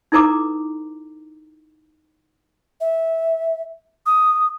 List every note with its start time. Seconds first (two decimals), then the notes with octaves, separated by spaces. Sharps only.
0.12 D#4 E4 A4 B4 A#5 D6
2.81 E5
4.06 D#6